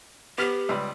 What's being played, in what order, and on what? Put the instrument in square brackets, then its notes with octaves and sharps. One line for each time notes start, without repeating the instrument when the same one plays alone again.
[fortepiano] B3 F6 [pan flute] G4
[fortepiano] C#2 G3 B4